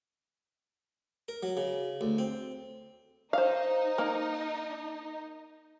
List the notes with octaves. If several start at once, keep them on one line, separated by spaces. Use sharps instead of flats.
A#4
F#3
C#3
D2
C4
D#4 C5 F5
A#3